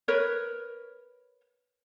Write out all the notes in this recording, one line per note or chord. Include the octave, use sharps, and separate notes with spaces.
A#4 B4 C#5